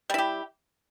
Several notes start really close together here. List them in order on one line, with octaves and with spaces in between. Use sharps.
G3 E4 G4